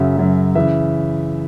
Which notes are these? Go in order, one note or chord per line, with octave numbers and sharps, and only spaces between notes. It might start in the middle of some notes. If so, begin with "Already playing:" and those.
Already playing: F#2 C#3 F#3 E5
F#2 C#3 F#3
C#3 E3 E5